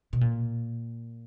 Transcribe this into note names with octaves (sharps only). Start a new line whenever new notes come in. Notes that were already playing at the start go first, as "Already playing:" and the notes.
B2
A#2